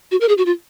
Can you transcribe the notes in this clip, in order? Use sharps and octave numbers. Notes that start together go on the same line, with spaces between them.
F#4
A#4
G#4
F#4
F4